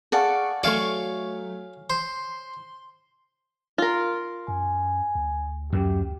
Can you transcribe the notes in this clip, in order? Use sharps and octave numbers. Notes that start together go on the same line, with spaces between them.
G#4 D5 F5 F#5 A5 C#6
F#3 A3 C#5 D5 F5 G#5 C#6
C5 C6
F4 A#4
F#2 G#5
D2
F#2 F#3 G4